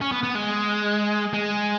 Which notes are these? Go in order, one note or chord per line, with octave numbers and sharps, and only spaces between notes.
C#4
B3
B3
G#3
G#3